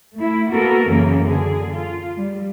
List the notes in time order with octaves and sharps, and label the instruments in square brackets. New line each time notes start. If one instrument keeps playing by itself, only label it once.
[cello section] A3 E4
A#3 B3 F#4 A4 A#4
F#2 C#3 E3 A#3 C#4
D3 G#4
F4
G3